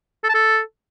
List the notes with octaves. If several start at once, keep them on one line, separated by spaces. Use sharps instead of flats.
A4
A5
A4